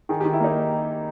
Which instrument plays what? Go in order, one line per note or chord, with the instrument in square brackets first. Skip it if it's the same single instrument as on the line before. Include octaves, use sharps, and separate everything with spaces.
[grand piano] D#3 [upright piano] G#4
[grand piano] D#3 [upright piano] G4
[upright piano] E4
[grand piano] A#3 [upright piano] D#4